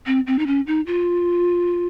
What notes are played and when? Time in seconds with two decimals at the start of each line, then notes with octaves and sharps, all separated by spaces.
0.06 C4
0.27 C4
0.39 D#4
0.47 C#4
0.67 D#4
0.87 F4